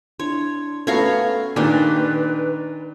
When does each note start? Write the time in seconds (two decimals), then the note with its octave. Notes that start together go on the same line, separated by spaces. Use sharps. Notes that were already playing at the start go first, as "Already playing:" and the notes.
0.20 D4 E4 C#5 C6
0.87 A3 B3 C#4 F#4 A4 C#5 F5 A#5
1.56 A#2 D#3 D4 G4 B4 G#5 F#6